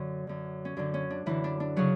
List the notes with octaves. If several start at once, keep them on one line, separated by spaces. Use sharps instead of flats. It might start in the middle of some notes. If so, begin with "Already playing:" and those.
Already playing: F#2 D3 C#4
F#2 D3
C#4
F#2 D3 D4
C#4
D4
F#2 D3 E3 E4
D4
D4
C#3 F#3 F#4